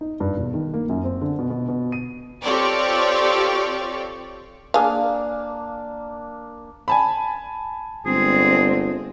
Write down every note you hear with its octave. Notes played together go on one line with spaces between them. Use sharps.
D#4
G2
E1
D#3
A#3
F#2
C4
D3
B2
B2
B2
D#7
C4 F4 G4 A4 C#5 D5
A#3 D4 G#4 F5
G#5 A5 B5
G1 G#3 C4 G#4